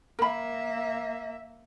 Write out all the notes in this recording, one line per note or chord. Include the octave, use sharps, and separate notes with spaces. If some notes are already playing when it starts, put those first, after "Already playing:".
A#3 A#4 E5 B5